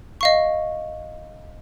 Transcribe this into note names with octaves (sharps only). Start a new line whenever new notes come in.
D#5 F5 C#6